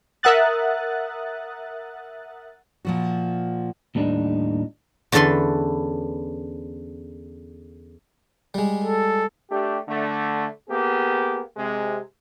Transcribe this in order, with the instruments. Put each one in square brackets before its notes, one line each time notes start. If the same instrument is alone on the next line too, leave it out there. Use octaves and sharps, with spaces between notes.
[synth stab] A#4 E5 F#5 D#6 F#6 A6
[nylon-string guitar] A#2 F3 F#4
[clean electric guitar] D#2 A2 G3 D4 D#4
[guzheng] E2 D3 C#4 A4 B4 C6
[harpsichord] G3 G#3
[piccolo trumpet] A4
[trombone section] A3 D4 G4
D3 A3
A#3 B3 G4 G#4
C3 G#3